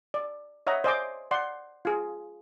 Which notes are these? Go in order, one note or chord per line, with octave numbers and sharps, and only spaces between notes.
D5
C#5 D#5 E5 F#5 A#5
C5 D5 D#5 G#5 C6 D6
D5 F#5 C6
F4 G#4